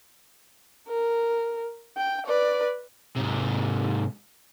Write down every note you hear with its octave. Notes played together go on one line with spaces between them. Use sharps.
A#4
G5
B4 D5
G#2 C3